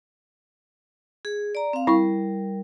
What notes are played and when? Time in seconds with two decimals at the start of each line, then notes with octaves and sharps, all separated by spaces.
1.25 G#4
1.55 D5 A#5
1.73 C4 F5
1.87 G3 E4 A#4 C#6